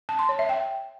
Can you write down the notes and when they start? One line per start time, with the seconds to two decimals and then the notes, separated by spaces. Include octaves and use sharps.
0.09 A5
0.19 C6
0.29 C#5
0.39 E5
0.49 G5